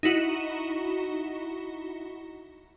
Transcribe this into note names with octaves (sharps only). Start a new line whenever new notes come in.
D#4 E4 F#4 E7